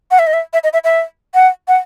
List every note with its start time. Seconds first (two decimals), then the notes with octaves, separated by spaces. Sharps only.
0.11 F#5
0.19 E5
0.27 D#5
0.33 E5
0.53 E5
0.64 D#5
0.73 E5
0.84 E5
1.34 F#5
1.68 F#5